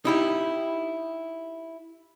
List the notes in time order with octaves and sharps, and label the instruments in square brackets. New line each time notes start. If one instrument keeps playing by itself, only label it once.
[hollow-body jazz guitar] D#4 E4 G4